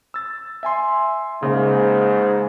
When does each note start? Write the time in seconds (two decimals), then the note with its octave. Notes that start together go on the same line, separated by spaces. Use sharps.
0.14 E6 A6
0.63 E5 G#5 C6
1.43 G#2 C#3 A#3